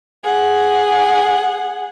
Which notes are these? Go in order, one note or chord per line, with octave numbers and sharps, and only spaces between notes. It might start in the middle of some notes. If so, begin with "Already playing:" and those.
G#4 F#5